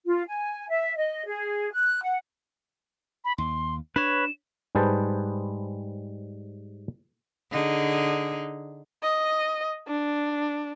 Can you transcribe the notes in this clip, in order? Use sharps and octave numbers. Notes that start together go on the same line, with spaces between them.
F4
G#5
E5
D#5
G#4
F#6
F#5
B5
D#2 C6
D4 B4 C#5 E7
G#2 G3 G#4 B4 C5 A5
D3 D#4 G#4
D#5
D4